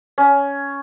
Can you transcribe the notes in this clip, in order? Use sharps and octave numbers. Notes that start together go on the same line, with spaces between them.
C#4